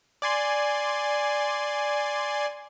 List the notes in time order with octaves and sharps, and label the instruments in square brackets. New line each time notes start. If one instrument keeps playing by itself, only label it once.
[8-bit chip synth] D5 G#5 C6